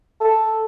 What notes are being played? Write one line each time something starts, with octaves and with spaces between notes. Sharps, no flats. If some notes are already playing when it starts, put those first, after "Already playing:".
A4